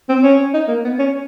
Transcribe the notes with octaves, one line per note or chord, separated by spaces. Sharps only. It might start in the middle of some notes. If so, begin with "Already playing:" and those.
C4
C#4
D#4
A#3
B3
C#4